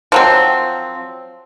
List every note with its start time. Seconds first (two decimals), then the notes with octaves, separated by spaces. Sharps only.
0.12 F3 F#3 C4